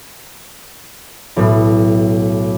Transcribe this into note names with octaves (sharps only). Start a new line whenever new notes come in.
B1 A2